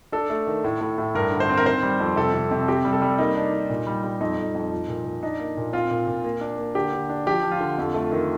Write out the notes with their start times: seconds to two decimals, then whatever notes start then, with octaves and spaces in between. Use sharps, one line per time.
0.12 D4 A4
0.30 A3
0.47 D#3
0.64 A2
0.81 A2
0.98 A2
1.15 G2 A#4
1.32 D3
1.40 C5
1.49 C4
1.57 A#4
1.66 D#3 C5
1.83 G3
2.00 F2
2.16 C3 A4
2.34 C3
2.51 C3
2.68 C4 G4
2.85 G3
2.93 A4
3.02 G3
3.18 A#3 D#4
3.35 D4
3.53 D4
3.70 A#2
3.87 G3
4.04 G3
4.20 F2 D#4
4.37 F2
4.55 F2
4.72 F3
4.88 A#2
5.05 A#2
5.23 D4 D#4
5.39 A#3
5.57 A#2
5.73 C4 F4
5.91 A#2
6.07 A#2
6.24 A#3
6.41 D4
6.58 A#3
6.75 D3 G4
6.93 D3
7.09 D4
7.27 F3 G4
7.43 F3
7.51 F4
7.61 D3
7.78 F2
7.94 A3
8.12 D#3